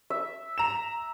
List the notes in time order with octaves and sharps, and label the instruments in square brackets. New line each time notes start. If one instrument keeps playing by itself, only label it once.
[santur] E5
[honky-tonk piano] A#5 E7